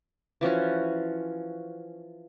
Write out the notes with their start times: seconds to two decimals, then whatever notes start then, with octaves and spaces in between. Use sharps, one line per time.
0.41 E3 F3 C#4 F#4